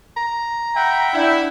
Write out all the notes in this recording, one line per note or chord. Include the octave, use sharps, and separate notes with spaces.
A#5
E5 F#5 G5 B5
D4 E4